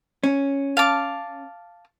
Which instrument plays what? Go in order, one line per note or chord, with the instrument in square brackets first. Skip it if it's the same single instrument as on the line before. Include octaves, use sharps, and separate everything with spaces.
[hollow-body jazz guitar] C#4
[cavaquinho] F5 A5 D6